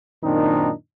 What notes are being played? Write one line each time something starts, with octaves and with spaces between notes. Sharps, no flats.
F#2 A#2 D#3 C4 D4 D#4